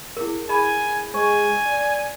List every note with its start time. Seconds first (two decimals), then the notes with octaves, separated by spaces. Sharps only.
0.17 E4 G#4 A#4
0.49 G#4 G#5 B5
1.14 G#3 C5 G#5 C#6
1.66 D5